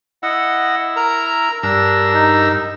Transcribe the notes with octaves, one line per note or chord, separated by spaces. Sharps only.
E4 D#5 F#5
A#4 A#5
G2 D4 A#4 E6
D#4